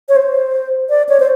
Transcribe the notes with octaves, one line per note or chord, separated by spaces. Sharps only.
C#5
C5
D5
C#5
C5